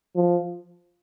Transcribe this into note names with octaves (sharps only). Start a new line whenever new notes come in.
F3